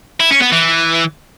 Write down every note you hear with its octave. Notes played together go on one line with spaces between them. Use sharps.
E4
C#4
B3
E3